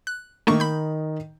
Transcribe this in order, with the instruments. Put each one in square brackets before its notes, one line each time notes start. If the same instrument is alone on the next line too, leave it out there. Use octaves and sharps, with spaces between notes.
[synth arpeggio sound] F#6
[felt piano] D#3 D#4 [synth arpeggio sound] A3 A#3 C#6
[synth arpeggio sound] B5 G6